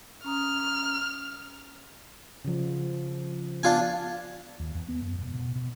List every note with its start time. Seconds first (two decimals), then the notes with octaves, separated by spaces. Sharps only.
0.24 C#4 A#5 D#6 F6
2.45 C#3 F3
3.63 B3 D4 F4 G#5
4.60 D#2
4.75 E2
4.89 B3
5.02 F#2
5.19 E1
5.34 B2
5.55 B2